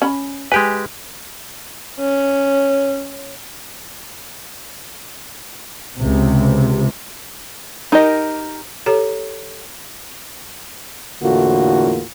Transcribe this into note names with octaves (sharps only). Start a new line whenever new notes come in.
C#4 B5
G#3 G4 B4 G#5
C#4
C#2 C3
D#4 G4 A#4 D#5
G4 A4 C#5 A#5
E2 A2 D3 A#3 F4 F#4